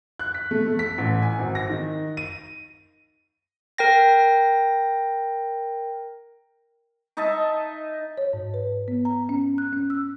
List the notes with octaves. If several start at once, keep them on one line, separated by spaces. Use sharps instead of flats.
F#6
B6
A3
A3
B6
A1
G#5
G#1
A#6
D#3
D#7
A#4 G5 A#6
D#4 D#5 E5 A5
C#5
G#2
B4
B3
A#5
C#4
F#6
C#4
E6